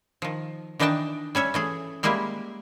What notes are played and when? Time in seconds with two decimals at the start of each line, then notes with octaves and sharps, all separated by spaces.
0.22 D#3 F3
0.79 D#3 E3 D4 D#4 G5 A5
1.35 G3 C#4 C#5 E5
1.54 E3 A3 G#4
2.03 G3 G#3 A#3 E4 G4